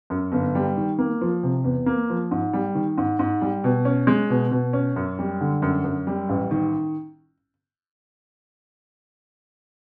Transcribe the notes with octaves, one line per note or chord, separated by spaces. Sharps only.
F#2
G1
G3
D#3
A#3
F3
C3
E2
A#3
F3
G#2
G3
D#3
G#2
G#2
G3
B2
C#4
G#3
B2
B2
C#4
F#2
G3
D3
F#2
F#2
G3
A1
D#3